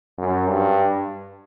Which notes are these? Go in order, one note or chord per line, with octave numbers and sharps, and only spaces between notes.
F#2
G2